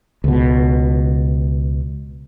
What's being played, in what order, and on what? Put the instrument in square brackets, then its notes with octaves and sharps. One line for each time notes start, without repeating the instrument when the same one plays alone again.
[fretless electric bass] C#2 B2